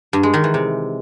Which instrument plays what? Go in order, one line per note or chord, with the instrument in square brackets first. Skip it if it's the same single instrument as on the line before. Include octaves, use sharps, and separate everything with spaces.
[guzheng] G2
G#3
D#3
E3
C3